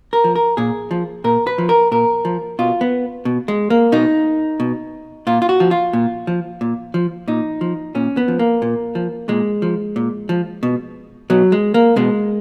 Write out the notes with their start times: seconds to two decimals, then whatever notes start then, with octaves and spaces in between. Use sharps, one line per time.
0.13 A#4
0.24 F3
0.36 A#4
0.57 A#2 G#4
0.91 F3
1.24 A#2 A#4
1.47 B4
1.58 F3
1.69 A#4
1.92 A#2 A#4
2.25 F3
2.59 B2 F4
2.81 B3
3.25 B2
3.48 G#3
3.70 A#3
3.92 B2 D#4
4.60 B2
5.27 A#2 F4
5.42 F4
5.49 F#4
5.60 F3
5.71 F4
5.93 A#2
6.27 F3
6.61 A#2
6.94 F3
7.28 A#2 D#4
7.61 F3
7.95 A#2 C#4
8.17 B3
8.28 F3
8.39 A#3
8.62 A#2
8.95 F3
9.28 A#2 G#3
9.62 F3
9.96 A#2
10.29 F3
10.63 B2
11.30 B2 F#3
11.52 G#3
11.74 A#3
11.96 B2 G#3